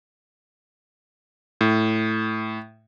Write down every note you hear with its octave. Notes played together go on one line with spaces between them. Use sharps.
A2